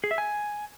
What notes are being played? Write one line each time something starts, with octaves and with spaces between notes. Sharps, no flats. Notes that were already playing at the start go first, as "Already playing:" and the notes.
G#4
E5
G#5